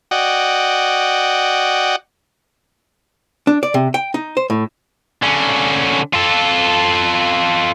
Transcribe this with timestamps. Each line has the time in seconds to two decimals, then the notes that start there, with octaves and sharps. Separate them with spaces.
0.11 F#4 D5 D#5 F#5 G5
3.47 D4
3.63 D5
3.74 C3
3.94 G5
4.14 D#4
4.37 C5
4.50 A2
5.22 D3 C#4
6.13 F4 A4